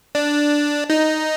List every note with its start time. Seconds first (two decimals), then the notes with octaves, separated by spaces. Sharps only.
0.15 D4
0.90 D#4